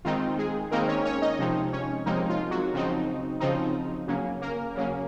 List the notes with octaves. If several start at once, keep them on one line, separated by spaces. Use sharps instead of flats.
D#3 G#3 C4 D#4 F4
G#3 G#4
D#3 G#3 A#3 C4 D#4 A#4
C#4 C#5
C#4 C#5
D#4 D#5
C3 F3 G#3 C4 D#4
C#4 C#5
C3 F3 G#3 A#3 C4 D#4 A#4
F4
F#3 F#4
C#3 F3 C4 D#4
C#3 F3 C4 D#4
C#3 F#3 A#3 C#4
A#3 A#4
C#3 F#3 A#3 C#4